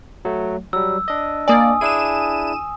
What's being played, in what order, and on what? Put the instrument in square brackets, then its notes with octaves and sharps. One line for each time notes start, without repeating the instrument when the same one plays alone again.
[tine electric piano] F#3 A3
[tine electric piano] F#3 G3 [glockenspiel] E6
[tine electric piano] D4 D#5
[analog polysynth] A#3 D5 [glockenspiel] G#5 D#6
[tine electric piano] D4 E4 G#4 [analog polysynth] D#7 E7